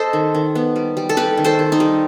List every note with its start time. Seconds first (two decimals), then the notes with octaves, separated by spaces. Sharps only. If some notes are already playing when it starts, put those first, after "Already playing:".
Already playing: A4 C5 D#5
0.13 D#3
0.35 D#3
0.55 B3
0.76 G3
0.97 G3
1.09 A4
1.17 G3 G4 B4
1.37 D#3
1.44 A4 C5
1.59 D#3
1.72 D#4
1.80 G3